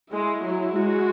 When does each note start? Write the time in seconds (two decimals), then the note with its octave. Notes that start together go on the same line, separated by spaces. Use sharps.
0.12 G#3 E4
0.44 F#3
0.76 G#3 F#4